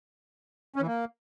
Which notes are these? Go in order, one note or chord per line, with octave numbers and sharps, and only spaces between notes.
C#4
E3
A#3